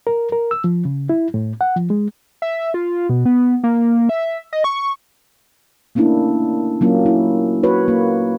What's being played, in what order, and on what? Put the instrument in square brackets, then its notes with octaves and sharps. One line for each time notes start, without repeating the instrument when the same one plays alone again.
[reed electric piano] A#4
A#4
E6
F3
C#3
E4
A2
F#5
F3
G#3
[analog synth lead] E5
F4
B2
B3
A#3
E5
D#5
C#6
[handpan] A3 A#3 C#4 D4 E4
F#3 A#3 C#4 F4
E4
F#4 B4 C#5
A#3